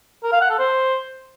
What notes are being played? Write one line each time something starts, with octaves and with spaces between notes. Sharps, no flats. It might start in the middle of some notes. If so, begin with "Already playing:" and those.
A#4
F5
F#5
A4
C5